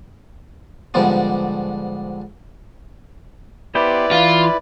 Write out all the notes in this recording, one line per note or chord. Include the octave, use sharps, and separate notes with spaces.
G#2 D3 F3 G3 B3 D4
B3 E4 G4 B4 C5 D5
E3 F4